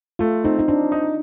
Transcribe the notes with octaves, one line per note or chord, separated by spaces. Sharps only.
A3 F4
C4 D#4
D#4
C4 D4
D#4